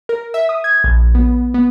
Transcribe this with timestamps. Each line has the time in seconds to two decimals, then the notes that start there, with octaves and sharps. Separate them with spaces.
0.09 A#4
0.34 E5
0.49 D#6
0.64 G#6
0.84 A#1
1.15 B3
1.54 B3